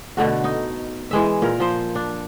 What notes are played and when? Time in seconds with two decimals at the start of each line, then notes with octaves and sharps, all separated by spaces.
0.17 B2 D3 A3 F#4
0.44 D#4
1.11 E3 G#3 E5
1.42 A#2 A#4
1.60 F3 C5
1.95 D4